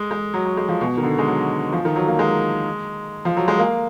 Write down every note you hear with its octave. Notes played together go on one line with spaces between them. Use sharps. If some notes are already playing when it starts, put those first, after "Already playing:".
Already playing: G#3
G#3
F#3
F#3
G#3
F3
B2
D#3
D3
G#3
F#3
F3
D#3
F#3
A#3
G#3
F3
F#3
G#3
A#3